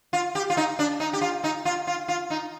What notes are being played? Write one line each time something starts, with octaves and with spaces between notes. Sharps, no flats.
F4
G4
F4
D#4
D4
D#4
G4
F4
D#4
F4
F4
F4
D#4